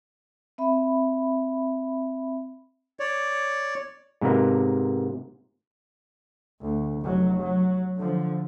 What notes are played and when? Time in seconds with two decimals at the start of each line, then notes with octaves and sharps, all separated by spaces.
0.58 C4 E5 B5
3.00 C#5 D5
4.21 G#2 C3 A#3 B3
6.62 D2
7.02 F1 F#3
7.40 F#3
7.97 D3 F3